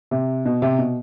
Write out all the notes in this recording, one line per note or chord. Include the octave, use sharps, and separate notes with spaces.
C3
B2
C3
B2